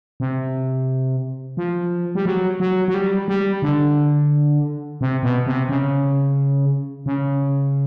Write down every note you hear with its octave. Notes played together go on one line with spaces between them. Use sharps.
C3
F3
G3
F#3
F#3
F#3
G3
G3
D3
C3
B2
C3
C#3
C#3